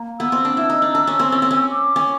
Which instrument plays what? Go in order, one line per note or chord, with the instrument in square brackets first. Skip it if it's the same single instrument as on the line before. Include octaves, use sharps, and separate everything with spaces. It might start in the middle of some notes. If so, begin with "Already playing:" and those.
Already playing: [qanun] A#3
[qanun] B3 [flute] E6
[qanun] C4
D4
E4
D#4
D4
D4
C#4
C4
C#4
C4
C#4
[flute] D6
[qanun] C#4